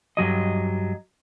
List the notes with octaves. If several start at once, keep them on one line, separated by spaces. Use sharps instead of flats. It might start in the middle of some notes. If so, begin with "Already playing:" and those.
G2 F#3 D#5